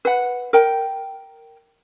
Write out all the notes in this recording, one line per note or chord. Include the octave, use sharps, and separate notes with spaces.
B4 F#5
A#4 G5